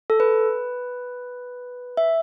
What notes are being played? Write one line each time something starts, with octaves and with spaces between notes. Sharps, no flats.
A4
B4
E5